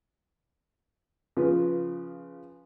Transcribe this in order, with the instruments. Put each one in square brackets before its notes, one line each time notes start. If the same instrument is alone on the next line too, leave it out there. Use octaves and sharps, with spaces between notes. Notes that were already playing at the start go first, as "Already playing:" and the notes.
[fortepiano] C#3 F3 F4 B4